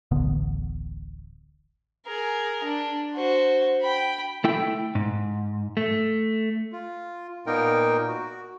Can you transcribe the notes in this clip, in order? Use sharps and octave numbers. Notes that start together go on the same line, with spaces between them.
D1 A1 D3 B3
G#4 A#4
D4
F#4 C5
G5 B5
A3 E4 G5
G#2
A3
F4
A#2 A#3 B3 D#4 A#4 G5
F#4